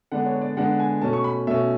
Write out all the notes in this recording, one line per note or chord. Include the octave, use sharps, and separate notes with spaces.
D3 G#3 B3 D4 F#5
C#5
D5
D3 G#3 B3 D4 F#5
G#5
B2 A3 C#4 A5
C#6
B5
B2 A3 C#4 E5